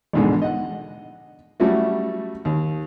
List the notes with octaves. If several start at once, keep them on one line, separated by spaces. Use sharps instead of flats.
A#1 E2 G#2 B2 D3 G#3
D#5 F#5
F#3 G3 A3 C#4 E4 F#4
D#2